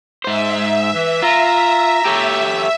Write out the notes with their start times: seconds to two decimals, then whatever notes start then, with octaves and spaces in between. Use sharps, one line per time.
0.24 G#2 C5 E5
0.92 E3
1.22 F4 A#5
2.05 G4 A4 C#5